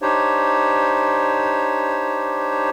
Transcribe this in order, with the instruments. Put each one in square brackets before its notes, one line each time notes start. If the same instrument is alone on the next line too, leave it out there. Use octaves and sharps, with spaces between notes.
[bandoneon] D4 D#4 G4 C5 C#5